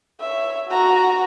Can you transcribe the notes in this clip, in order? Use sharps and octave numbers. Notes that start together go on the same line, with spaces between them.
C#5 E5
F#4 A#5